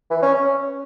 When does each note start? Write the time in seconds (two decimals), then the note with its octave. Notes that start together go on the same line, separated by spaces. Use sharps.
0.10 E3
0.22 C#4
0.34 C#4